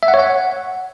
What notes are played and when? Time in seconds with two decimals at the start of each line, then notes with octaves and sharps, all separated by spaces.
0.03 E5
0.08 F#5
0.14 C#5
0.19 F#5